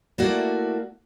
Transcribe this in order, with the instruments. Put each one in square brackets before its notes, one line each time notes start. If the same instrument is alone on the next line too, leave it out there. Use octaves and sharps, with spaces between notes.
[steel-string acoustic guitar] A3 A#3 E4 F#4 D5